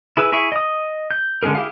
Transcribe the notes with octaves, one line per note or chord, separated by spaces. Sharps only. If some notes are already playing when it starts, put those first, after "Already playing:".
E4 G#4 B4 E6
E4 G#4 E5 C#6
D#5 D#6
G6
D3 G#3 C#4 G#4 A#4
E4 G4 G#4 F5